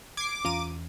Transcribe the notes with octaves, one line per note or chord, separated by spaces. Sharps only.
D6 G#6 C7
E2 E3 C#4 F4 A#5 D#7